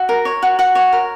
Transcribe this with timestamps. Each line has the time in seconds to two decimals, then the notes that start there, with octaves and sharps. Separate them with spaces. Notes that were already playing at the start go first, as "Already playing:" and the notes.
Already playing: F#4 E5
0.09 A#4
0.25 C#5
0.42 F#4
0.59 F#4 F#5
0.75 C#5
0.93 A#4